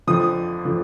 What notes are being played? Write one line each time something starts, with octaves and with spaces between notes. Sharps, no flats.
F2 D3 F3 D#6
D3 F3